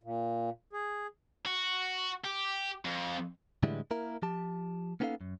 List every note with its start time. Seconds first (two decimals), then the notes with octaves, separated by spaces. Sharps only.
0.03 A#2
0.73 G#4
1.46 F#4
2.24 G4
2.85 F2
3.63 A2 D3 E3 G3 G#3 E4
3.91 A#3 E4 A#4
4.22 F3 G4 A5
5.00 A#3 B3 C#4 D#4 A4 F5
5.21 F#2